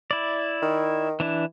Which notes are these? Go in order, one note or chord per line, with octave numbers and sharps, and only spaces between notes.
E4 D5
D#3
E3 D4 E4